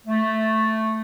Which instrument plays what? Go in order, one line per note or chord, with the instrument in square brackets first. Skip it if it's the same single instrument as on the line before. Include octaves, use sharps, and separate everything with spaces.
[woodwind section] A3